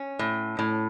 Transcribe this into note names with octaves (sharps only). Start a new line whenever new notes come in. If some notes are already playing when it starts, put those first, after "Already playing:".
Already playing: C#4
A2
A2